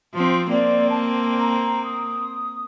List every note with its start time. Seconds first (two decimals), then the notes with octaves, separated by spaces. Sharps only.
0.14 F3 C4
0.50 A#3 C4 D5
0.89 A5
1.40 A#5
1.83 D#6